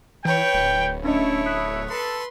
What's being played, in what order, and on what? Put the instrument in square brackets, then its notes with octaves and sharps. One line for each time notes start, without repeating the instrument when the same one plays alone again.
[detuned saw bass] E3 [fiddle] B4 C#5 [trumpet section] G5
[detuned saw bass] D1
[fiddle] A3 C#5 [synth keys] C#4 D4 D#5 [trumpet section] E4
[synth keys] D#6 F#6 B6
[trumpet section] A4 [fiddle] B4 C6